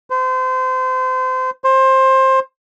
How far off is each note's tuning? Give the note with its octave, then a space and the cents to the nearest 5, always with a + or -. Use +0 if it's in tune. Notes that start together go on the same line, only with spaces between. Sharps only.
C5 -30
C5 +20